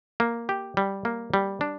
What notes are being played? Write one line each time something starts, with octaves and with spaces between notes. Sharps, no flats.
A#3
G4
G3
A#3
G3
D4